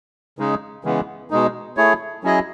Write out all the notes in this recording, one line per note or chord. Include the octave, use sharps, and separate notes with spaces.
C#3 G#3 D#4
C#3 E3 G#3 B3
B2 G#3 D#4
A3 E4 G#4 C#5
F#3 C#4 E4 G#4 D#5